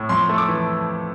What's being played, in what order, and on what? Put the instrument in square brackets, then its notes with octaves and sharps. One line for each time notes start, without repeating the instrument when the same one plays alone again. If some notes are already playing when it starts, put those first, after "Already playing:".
Already playing: [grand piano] A2
F2 C6
A3
D6
E3